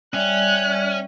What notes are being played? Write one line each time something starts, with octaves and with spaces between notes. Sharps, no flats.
G3 C#4 D5 E5 F#6